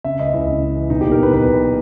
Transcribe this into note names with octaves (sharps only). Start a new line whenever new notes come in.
C#3 E5
C#2 D#5
C#2 E4
C#3
C#3
E3
B1 D#4
A#2 G4
A#4
A#2 B4
B1 B4
B1